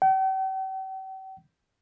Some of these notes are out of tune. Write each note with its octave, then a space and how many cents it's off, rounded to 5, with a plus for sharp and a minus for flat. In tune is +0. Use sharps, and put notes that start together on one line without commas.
G5 -45